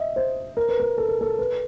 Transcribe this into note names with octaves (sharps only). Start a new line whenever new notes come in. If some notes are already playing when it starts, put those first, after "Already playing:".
Already playing: D#5 E5
C5
A#4
B4
A#4
A4
A#4
A4
B4